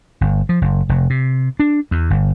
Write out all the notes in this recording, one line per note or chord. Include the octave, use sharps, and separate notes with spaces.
G1
F3
F#1
F1
C3
D4
E2
G1